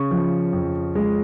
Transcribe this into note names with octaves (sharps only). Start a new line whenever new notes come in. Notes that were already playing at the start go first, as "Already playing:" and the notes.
Already playing: C#3 C#6
F3
F2
G#3